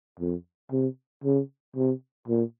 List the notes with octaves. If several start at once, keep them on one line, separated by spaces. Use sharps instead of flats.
F2
C3
C#3
C3
A#2